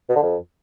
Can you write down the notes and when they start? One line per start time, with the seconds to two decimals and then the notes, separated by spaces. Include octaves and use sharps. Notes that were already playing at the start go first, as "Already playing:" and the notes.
0.09 B2
0.16 D3
0.22 F2